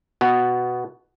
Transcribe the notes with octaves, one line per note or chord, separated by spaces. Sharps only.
B2 B3